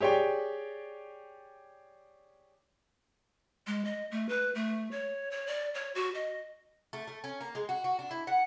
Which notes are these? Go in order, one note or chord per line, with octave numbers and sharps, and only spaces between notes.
G4 G#4 C#5 D5 G5
G#3
D#5
A3
B4
A3
C#5
C#5
D5
C#5
F#4
D#5
A3
A3
C#4
A#3
G#3
F#4
F#4
D4
E4
F#5